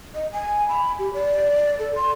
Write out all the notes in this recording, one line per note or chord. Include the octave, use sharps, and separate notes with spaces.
D#5
G#5
B5
G4
D5
A4
C6